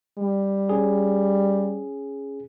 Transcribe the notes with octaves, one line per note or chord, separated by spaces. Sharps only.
G3
C#4 G#4